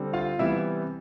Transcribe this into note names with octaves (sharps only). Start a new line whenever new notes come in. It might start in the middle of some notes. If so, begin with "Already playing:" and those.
Already playing: D3 G3 C4
F4 F5
C3 E3 G3 B3 E4 E5